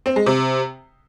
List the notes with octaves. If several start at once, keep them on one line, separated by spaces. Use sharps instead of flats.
C4
G#3
C3